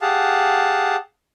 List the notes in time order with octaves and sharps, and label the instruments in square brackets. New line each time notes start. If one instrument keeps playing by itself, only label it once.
[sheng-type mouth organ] G4 G#4 F5 F#5 A5